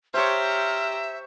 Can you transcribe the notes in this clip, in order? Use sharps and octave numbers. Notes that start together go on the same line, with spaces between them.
G4 C5 C#5 E5 A#5 F6